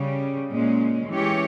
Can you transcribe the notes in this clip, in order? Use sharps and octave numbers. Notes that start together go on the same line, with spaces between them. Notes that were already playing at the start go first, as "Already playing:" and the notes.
Already playing: C#3 G3 C#4
A#2 G#3 C#4
E3 G#3 C#4 G4 C#5